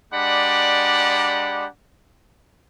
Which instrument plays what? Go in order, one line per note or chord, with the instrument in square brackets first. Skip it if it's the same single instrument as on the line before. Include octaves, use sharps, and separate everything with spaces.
[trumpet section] G#3 D4 G4 D5 F#5 B5